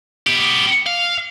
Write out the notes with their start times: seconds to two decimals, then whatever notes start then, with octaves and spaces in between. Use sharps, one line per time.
0.27 B3 G4
0.87 F5